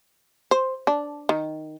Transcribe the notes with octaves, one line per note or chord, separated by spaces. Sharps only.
C5
D4
D#3